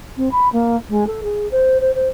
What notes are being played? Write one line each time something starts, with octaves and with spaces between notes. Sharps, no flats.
C4
B5
A#3
G#3
A4
G#4
C5
C5
C5